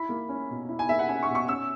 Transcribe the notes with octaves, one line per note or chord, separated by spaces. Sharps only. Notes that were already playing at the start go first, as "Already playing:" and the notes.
Already playing: E4 B5
A#3
C#4
B2
E4
G#5
A#3 E5
F#5
C#4 G#5
C#6
B2
C#6
C#4 E6